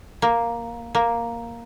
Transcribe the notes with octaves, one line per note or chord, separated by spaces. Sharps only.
A#3
A#3